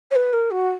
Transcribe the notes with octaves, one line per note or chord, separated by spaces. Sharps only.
C#5
B4
A#4
F#4